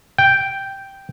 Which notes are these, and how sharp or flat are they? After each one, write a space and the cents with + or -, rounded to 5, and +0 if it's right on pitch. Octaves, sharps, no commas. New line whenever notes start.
G5 -5